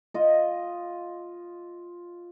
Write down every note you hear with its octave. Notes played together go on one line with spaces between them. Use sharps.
F4 D#5